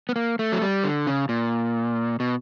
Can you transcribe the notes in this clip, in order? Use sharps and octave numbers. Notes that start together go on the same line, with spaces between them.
B3
A#3
A3
F#3
G3
D3
C#3
A#2
B2